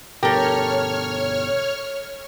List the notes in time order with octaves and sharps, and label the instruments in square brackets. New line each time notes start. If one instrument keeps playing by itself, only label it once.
[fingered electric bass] G1 B2 [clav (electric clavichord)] G4 [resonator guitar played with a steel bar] A4 A#4 [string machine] C#5 F6